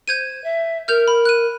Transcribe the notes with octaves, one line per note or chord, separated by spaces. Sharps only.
C5 G6 G#6 D#7
E5
A#4 F6 G6 F7
B5
F#6 D#7